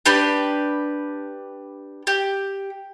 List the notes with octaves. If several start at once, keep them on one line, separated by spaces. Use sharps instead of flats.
D4 G4 B4
G4